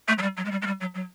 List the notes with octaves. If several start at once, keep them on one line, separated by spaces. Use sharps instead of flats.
A3
F#3
G3
F#3
G#3
G3
G#3
G3
F#3
F#3